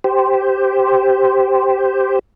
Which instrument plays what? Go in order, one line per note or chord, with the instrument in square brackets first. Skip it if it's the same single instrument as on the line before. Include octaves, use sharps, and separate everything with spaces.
[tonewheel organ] G4 C5